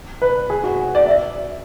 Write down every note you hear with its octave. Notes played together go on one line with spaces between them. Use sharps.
B4
G#4
F#4
D5
E5